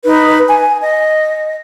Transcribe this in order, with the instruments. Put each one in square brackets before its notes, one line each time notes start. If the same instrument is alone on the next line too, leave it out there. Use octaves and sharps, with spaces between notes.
[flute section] D#4 B4
G#5
D#5